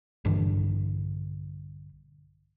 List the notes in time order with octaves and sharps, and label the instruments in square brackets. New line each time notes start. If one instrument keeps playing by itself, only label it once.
[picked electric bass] A#1 G2 D3 E3